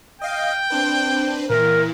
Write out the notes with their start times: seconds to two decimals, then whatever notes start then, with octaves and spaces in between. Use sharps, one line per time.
0.21 D#5 F5 G5
0.70 C4 D4 B4
1.50 A#2 E3 A#4